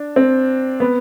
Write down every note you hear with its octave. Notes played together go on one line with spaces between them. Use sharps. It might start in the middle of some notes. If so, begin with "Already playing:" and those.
Already playing: D4
C4
B3